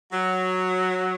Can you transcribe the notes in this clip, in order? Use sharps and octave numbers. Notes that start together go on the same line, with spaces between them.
F#3